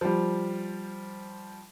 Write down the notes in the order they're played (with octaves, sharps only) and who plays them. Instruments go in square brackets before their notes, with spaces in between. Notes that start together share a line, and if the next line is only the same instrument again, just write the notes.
[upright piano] F3 G3